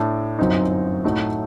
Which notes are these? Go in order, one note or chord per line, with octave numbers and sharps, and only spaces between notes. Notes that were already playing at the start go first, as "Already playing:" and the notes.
Already playing: A2 A3 D4
G1 F#2 F#3 C4 D#4
A2 F#3 A3 D#4